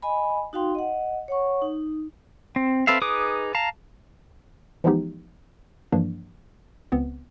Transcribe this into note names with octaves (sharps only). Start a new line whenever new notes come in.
D#5 G#5 B5
D#4 F#4 F5 G5 C6
D#5 F#5
C#5 F#5 C#6
D#4
C4
C4 A4 B4 E5 F5
D#4 G#4 B4 D6 D#6
F5 A5 A#5
E3 F3 G#3 B3 D#4 G4
G2 E3 F3 A#3 D4
C#2 B3 C4